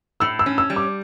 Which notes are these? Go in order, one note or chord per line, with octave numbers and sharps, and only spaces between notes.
A2 E6
E6
C#4
E6
G3
D6